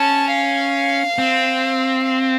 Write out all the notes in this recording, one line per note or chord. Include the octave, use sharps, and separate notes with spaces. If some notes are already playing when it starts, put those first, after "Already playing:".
Already playing: C#4 A5
F5
C4
F5